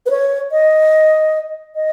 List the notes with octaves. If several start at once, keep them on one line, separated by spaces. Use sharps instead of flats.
B4
C#5
D#5
D#5